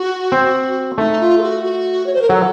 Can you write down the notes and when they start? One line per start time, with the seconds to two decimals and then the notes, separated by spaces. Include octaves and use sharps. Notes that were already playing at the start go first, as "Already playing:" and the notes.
Already playing: F#4
0.32 C4
0.98 A3 D#4
1.20 F4
1.38 A4
1.42 F#4
1.64 F#4
2.06 C#5
2.13 C5
2.21 A#4
2.29 F#3 A4